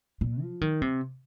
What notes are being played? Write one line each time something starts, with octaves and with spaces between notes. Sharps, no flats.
A#2
F3
D#3
C3